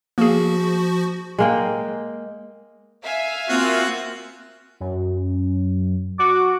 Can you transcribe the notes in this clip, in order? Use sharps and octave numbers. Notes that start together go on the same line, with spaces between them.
F3 A#3 F#4 G#4
G#3 A#3 G5
E5 F5 G#5
A#3 C4 F4 F#4
F#2
F#4 D6